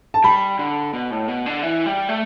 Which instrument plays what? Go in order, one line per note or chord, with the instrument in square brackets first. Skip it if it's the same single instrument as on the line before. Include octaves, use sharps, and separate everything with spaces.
[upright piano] A5
[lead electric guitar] G3 [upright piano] B5
[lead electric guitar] D3
B2
A2
B2
D3
E3
G3
A3